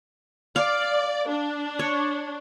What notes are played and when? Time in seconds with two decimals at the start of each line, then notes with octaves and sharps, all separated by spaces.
0.56 D5 F5
1.28 D4
1.79 C#5